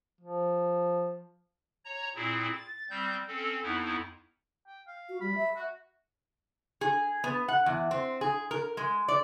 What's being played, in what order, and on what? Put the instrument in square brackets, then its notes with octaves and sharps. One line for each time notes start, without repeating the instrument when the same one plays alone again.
[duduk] F3
[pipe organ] C#5 A#5
A#2 C4 E4 G#4
A6
G3 C4 G6
C4 C#4 A4
F2 B3 D#4 E4
[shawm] G5
F5
[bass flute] F#4
[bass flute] G3 [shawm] B5
[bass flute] E5
[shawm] F#4
[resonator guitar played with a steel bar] G#4
B3
F#5
E2
C4
G#4
A#4
G#3
D5